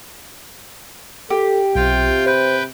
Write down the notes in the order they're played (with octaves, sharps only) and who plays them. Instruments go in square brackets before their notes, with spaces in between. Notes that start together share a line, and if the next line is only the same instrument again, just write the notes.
[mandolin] G4 [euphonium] A4
[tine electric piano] B1 [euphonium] C3 [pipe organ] F4 G5
[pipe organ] B4 G5 [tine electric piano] C5 G6